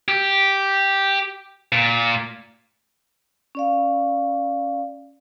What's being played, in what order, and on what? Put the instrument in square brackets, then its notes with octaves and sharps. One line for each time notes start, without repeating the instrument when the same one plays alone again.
[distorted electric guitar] G4
A#2
[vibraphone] C#4 D5 F5